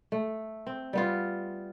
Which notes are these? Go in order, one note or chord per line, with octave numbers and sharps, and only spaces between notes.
A3
C4
G3 B3 F4